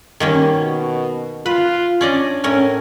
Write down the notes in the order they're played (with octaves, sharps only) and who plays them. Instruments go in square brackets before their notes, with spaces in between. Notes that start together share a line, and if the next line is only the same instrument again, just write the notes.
[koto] D#3 A#3 C#4 [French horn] G3
[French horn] B2
[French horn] F4 [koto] B4
[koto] C#4 D5 D#5 [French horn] D4
[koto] A2 C#4 A#4